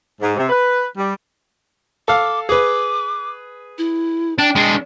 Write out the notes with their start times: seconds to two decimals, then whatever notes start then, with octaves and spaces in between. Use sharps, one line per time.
0.21 G#2
0.37 C3
0.49 B4
0.97 G3
2.08 A4 F5 D6
2.49 G#4 B4 D6
3.78 E4
4.38 D4 G5
4.55 G#3 D4